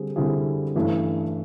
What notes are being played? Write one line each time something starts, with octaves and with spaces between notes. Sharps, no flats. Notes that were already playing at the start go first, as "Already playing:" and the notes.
Already playing: D3 G3 C4 G#4
D3 G3 C4 E4 G#4
G2 E3 A3 C#4